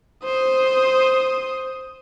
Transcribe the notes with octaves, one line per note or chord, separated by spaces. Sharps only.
C5 D#6